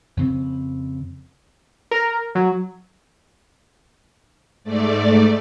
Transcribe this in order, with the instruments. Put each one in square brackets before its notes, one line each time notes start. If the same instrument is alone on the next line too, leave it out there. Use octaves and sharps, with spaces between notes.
[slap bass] F2 C#3 C4
[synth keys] A#4
F#3
[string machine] G#2 A3 D5